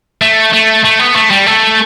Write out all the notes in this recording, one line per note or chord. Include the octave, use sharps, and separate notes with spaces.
A3
A3
A3
B3
A3
G3
A3